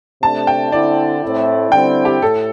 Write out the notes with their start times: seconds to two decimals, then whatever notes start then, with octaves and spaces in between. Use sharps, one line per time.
0.22 C3 A3 D4 A5
0.47 G5
0.72 D3 C4 E4 D5
1.22 A2 A3 C4 E4
1.72 D3 G3 C4 E4 G5
2.05 G4
2.22 A2 A4